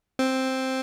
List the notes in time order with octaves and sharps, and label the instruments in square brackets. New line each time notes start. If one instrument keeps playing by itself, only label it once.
[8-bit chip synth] C4